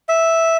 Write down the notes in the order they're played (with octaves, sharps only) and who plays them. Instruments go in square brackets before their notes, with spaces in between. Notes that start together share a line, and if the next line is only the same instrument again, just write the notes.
[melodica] E5